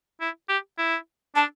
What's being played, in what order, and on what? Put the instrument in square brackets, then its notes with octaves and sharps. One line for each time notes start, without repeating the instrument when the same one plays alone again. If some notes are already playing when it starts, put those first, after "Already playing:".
[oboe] E4
G4
E4
[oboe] D4 [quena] A5